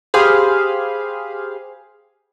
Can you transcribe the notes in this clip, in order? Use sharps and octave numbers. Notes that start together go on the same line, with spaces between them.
G4 G#4 C5 F5 B5